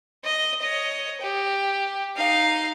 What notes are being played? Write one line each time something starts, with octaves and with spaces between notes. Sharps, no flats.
D#5
C#5 D#5
G4
D#4 F5